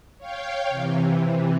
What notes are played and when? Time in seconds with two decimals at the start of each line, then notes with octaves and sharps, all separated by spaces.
0.18 C#5 F5 G5
0.69 C3 E3